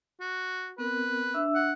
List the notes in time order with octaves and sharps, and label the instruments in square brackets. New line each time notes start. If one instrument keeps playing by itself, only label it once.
[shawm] F#4
[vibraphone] B3 C4 A#4 [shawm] B4
[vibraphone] D4 E5 E6
[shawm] F#5